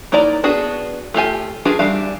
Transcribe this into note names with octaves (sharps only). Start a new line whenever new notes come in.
A#3 D#4 E4 D5 A#5
B3 D4 F#4 G#4
A3 F4 G4 G#5
D4 F4 F#4 G#4 B4
E3 G3 D4 F5